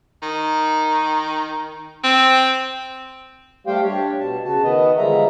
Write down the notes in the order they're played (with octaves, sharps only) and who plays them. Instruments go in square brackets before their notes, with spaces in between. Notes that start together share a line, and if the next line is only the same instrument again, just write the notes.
[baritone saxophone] D#3
C4
[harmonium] G3 A3 G4 C5 F5 G5
D4 G4 C#5
B2 A5
C#3 F#4 A5
D#3 B3 B4 D#5
D3 F3 G3 G#3 E5 A#5